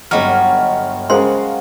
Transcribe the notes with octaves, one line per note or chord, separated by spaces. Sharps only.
G1 F#3 G3 D#5 F6
C#3 G#3 A#4 C5 F5 F#5 C6